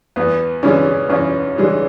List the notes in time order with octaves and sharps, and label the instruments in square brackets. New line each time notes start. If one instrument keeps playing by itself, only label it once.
[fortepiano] E2 [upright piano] B3
[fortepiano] C#3 E3 G#3 D4 [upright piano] C#4
[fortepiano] E2 [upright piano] C#4
[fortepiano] C#3 E3 G#3 D4